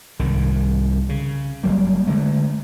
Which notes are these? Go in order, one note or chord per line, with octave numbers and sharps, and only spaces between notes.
C2 G#2 D#3
C#3
F#1 F#3 G3 A#3
D3 G#3 A3